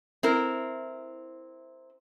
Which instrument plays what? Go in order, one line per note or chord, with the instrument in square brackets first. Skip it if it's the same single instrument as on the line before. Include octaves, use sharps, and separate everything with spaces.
[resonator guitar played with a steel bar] C4 E4 A#4